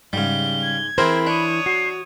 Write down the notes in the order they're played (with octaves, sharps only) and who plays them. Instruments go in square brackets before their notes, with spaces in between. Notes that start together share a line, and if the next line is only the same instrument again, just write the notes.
[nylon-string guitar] G#2 [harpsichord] C#3 G3 [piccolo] G7
[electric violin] G#6
[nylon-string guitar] E3 E4 C5 [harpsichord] C4 G#4 A#4 [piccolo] B5
[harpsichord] D4 [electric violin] C#5 D#6
[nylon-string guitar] F#4 [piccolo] C7